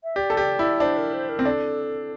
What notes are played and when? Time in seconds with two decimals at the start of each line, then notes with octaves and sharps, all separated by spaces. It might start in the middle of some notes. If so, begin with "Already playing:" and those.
0.04 E5
0.16 G4 D5
0.30 A4
0.37 G4
0.59 E4
0.80 D4 C5
0.97 A#4
1.14 C5
1.29 A#4
1.39 C4
1.45 D4 A4